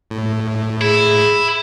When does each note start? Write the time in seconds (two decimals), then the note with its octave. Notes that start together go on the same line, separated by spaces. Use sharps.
0.10 A2
0.81 E4 G#4